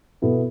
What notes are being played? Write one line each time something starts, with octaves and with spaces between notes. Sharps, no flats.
B2 B3 E4 A4